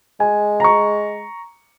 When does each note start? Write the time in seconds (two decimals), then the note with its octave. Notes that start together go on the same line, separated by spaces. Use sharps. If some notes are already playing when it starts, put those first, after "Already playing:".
0.20 G#3 G#5
0.60 A#5 C#6